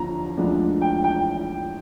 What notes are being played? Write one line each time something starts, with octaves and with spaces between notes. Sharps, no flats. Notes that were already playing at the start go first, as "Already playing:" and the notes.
Already playing: D#2 D3 F3 A#5
D2 D3 F3 G#3 D4
G5
G5